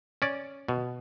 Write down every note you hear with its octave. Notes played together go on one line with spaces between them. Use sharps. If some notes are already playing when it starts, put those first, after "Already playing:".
C#4 D5
B2